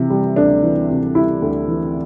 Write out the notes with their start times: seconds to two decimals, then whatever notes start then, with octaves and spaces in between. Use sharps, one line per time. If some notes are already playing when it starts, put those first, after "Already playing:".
Already playing: C3 E3
0.10 G3
0.36 D2 D4
0.62 E3
0.89 C3
1.15 G3 E4
1.42 D2
1.68 E3